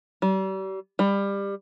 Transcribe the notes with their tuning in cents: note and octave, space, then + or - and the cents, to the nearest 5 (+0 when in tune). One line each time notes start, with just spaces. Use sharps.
G3 -40
G3 +20